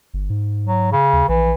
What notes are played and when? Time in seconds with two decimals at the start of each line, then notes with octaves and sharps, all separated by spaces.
0.14 G1
0.30 G#2
0.67 F#3
0.92 C#3
1.13 D#2
1.29 A#1 E3